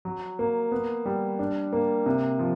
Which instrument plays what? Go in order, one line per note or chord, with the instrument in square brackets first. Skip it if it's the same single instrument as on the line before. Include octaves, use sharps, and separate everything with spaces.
[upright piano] F#3
A#3
B3
G3
D4
A#3
C3
F3